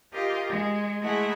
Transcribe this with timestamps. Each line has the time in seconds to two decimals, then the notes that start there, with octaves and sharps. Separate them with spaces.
0.12 F4 G4 A#4 D#5
0.49 G#3
1.01 G#3 A3 E4 G#4 E5 F#5